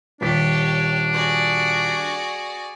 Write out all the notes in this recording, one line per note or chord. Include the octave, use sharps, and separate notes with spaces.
D#1 D4 G4 C#5 B6
F#4 G#4 D5